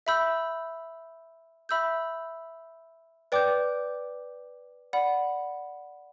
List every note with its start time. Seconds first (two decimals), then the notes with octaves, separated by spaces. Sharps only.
0.07 E5 B5 E6 G6
1.69 E5 B5 E6 G6
3.32 B4 D5 G5 D6 G6
4.93 D5 F#5 B5